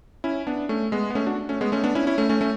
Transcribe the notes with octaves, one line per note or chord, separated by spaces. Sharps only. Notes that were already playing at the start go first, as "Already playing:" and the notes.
C#4 E4
B3 D4
A3 C#4
G#3 B3
B3
A3 C#4
D4 F#4
A3 C#4
G#3 B3
A3 C#4
B3 D4
C#4 E4
C#4 E4
A3 C#4
A3 C#4
A3 C#4